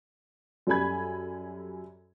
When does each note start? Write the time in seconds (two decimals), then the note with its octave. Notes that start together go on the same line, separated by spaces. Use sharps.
0.67 F#2 G3 A4 G#5 B5 G#6